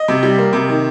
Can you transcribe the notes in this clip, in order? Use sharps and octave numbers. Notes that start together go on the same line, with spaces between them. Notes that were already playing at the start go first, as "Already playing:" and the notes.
Already playing: D#5
C3
G3
A#3
C3
D#3